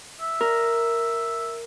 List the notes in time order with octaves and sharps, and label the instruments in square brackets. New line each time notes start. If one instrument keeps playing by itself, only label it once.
[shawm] E5
[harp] A#4